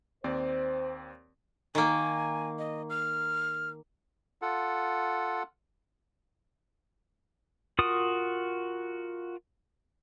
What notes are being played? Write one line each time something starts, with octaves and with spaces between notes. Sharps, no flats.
D#2 C4 C5 D5
D#3 A#3 G#5
D#5
F6
F4 A4 F#5
F4 F#4 A#4 D#6